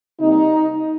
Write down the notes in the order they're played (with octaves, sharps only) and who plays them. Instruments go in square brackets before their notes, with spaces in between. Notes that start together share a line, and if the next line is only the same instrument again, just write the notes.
[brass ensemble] C3 G3 A#3 D#4